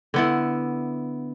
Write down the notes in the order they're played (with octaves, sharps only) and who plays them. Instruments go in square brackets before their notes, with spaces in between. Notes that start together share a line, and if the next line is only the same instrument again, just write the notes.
[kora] D3 B3 E4